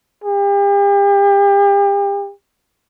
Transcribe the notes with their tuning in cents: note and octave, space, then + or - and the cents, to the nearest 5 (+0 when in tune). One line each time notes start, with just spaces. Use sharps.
G4 +40